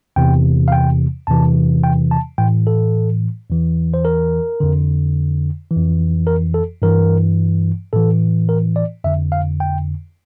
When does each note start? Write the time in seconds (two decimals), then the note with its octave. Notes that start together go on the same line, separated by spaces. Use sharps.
0.16 E2 C3 E3 G5
0.68 F5
0.72 G5
1.27 E2 C3 E3 A5
1.84 G5
2.11 A5
2.38 A2 E3 G5
2.67 A4
3.49 E2 E3
3.94 C5
4.05 A#4
4.60 F2 D3
5.71 E3
5.76 F2
6.27 A#4
6.54 A4
6.82 G2 E3 A#4
7.93 A2 E3 A4
8.49 A#4
8.76 D5
9.04 F2 D3 E5
9.32 F5
9.60 G5